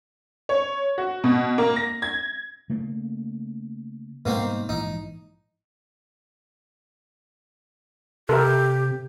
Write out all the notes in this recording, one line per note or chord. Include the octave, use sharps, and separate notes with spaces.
C#5
F#4
B2
A#3
A#6
G#6
C#3 A3 A#3
G#2 B2 D#3 G3 A#3 C4
A#1 G#2 E3 D#4
C3 G4 A4 A#4 E5